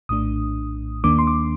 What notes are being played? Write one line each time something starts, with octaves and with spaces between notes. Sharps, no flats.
A#1 A2 A3 D4 D#6
D#2 D#3 A#3 D4 D6
C6
D6